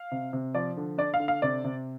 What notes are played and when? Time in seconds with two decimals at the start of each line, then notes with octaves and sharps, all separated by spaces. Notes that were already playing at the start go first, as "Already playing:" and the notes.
Already playing: F5
0.11 C3
0.33 C3
0.55 F3 D5
0.77 D3
0.98 D4 D5
1.14 F5
1.20 D3
1.28 F5
1.42 C3 D5
1.64 C3